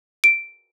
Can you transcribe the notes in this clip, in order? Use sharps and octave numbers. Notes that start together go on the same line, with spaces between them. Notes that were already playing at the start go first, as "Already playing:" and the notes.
D7